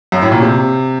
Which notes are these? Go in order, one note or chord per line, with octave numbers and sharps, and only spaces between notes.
F#2
A2
A#2
C3